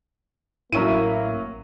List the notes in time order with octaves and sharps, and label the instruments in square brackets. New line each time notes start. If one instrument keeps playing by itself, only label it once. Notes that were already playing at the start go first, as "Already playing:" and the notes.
[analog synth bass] A1 [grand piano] F#3 C#4 D#7 [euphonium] A#3 [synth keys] E4 E5